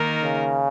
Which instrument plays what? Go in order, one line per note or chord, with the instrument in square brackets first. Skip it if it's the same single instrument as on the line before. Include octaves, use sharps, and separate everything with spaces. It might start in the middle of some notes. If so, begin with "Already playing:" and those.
Already playing: [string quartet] D#3 A#3 D#4 A#4
[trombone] C#3